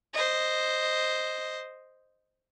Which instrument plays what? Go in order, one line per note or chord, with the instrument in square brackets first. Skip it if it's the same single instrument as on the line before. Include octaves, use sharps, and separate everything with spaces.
[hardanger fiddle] C5 D#5